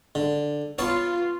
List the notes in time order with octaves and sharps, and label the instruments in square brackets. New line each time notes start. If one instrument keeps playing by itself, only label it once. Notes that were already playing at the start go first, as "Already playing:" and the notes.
[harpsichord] D3
[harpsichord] B3 C#5 A5 [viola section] F4